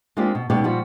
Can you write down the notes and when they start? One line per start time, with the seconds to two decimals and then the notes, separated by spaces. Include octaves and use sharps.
0.17 G#3 A#3 C4 D4 F4 G4
0.35 B2
0.50 D#2 B2 G#3 C#4 G4 D5
0.64 A#2 F3 G3 F#4